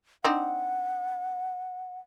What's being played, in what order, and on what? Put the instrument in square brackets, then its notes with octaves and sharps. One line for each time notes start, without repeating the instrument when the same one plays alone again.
[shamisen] C4 D4 D#4 [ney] F#5